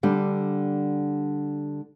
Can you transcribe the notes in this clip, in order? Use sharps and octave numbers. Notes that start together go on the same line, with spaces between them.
D3 G3 D4